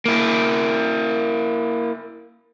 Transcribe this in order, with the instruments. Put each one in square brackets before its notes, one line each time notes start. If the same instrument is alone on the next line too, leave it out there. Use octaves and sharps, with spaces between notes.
[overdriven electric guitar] A#3 E4